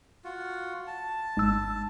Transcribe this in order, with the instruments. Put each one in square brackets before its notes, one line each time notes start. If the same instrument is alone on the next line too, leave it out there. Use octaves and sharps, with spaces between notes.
[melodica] F4 F#4
A5
[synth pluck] G#1 E6